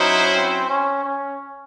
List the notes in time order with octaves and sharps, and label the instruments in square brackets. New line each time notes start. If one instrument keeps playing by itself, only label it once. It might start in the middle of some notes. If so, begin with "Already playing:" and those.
Already playing: [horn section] F#3 C#4 E4 C5 [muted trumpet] D#4
[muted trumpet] C4
C#4
C#4